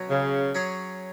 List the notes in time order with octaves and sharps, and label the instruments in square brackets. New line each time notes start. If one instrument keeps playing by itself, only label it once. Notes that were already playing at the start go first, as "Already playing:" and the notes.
Already playing: [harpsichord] B2 F#3 C#4 F#4
[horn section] C#3
[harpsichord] F#3 C#4 G#4